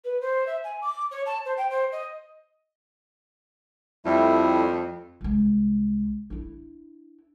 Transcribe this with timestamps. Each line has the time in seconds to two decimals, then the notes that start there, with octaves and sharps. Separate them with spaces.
0.04 B4
0.21 C5
0.47 E5
0.64 G#5
0.82 D6
1.11 C#5
1.26 A5
1.45 C5
1.57 G5
1.70 C5
1.92 D#5
4.05 F2 G3 A3 E4
5.21 C2 G#3
6.30 D4 E4